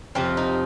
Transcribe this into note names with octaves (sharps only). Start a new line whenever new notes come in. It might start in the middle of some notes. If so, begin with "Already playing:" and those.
F2 C3 F3 C4
D#4